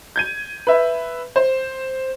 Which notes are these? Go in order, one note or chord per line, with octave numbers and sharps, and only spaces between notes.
G6 G#6 D#7
B4 E5
C5